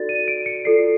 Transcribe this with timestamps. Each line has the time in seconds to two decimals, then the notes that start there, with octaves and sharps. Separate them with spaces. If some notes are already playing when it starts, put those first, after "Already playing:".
Already playing: D#4 F#4 A4 D5 A6
0.09 D#7
0.28 D7
0.46 C#7
0.65 F4 A4 D5 C7